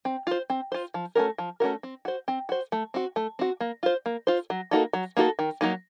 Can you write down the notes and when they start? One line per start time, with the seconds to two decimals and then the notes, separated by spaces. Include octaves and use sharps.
0.05 C4
0.27 F4 C5
0.50 C4
0.72 F4 C5
0.94 F3
1.15 A3 C#4 F#4 A#4
1.38 F3
1.60 A3 C#4 F#4 A#4
1.83 C4
2.05 F#4 C5
2.28 C4
2.49 F#4 C5
2.72 A3
2.94 C4 F#4
3.16 A3
3.39 C4 F#4
3.61 A#3
3.83 F4 C5
4.06 A#3
4.27 F4 C5
4.50 F#3
4.71 A#3 D#4 F#4 A4
4.93 F#3
5.17 A#3 D#4 F#4 A4
5.39 D#3
5.61 F#3 A#3 D#4